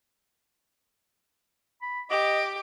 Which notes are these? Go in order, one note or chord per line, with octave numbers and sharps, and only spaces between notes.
B5
G4 D#5 D6